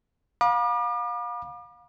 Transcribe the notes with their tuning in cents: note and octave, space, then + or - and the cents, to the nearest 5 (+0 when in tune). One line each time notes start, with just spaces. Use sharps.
F5 +35 B5 -40 D6 +40